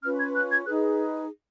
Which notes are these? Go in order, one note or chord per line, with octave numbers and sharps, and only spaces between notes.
C#4 F4 B4 F6
G#6
F#6
G#6
D#4 G#4 B4 F#6